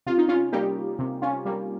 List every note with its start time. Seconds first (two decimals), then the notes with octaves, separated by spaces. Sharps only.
0.06 C3 F4
0.18 D#4
0.28 C#4 F4
0.52 G3 A#3 D#4 G4
0.99 C3
1.22 C#4 F4
1.45 G3 A#3